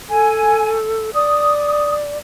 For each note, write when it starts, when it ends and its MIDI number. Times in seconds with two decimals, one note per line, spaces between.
0.10 1.10 69
0.10 0.73 80
1.14 2.18 74
1.14 1.92 87